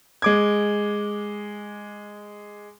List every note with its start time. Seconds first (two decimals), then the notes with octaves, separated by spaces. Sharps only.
0.22 G#3 D6 G#6